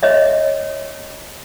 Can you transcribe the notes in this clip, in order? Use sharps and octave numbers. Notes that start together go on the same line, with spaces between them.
C#5 D#5 E5